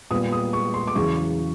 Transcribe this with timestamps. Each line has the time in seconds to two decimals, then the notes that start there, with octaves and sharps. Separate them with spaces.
0.11 A#2 G3 B3 D#6
0.32 D#6
0.53 C#6
0.74 C6
0.87 D6
0.95 E2 C#3 F#3 C#6